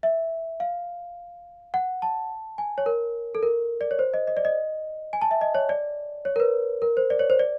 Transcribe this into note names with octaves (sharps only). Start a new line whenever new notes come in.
E5
F5
F#5
A5
G#5
C#5
A#4
A4
A#4
D5
C#5
C5
D#5
D#5
D5
D#5
G#5
A5
E5
D#5
C#5
D5
C#5
A#4
B4
A#4
C5
D5
C#5
C5
D5